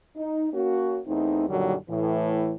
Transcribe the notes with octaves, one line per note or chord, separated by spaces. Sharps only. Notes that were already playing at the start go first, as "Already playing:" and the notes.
D#4
A#3 C#4 F#4
E2 A3 C4 D#4
F#2 A#2 D3 D#3 F#3 G3
A2 E3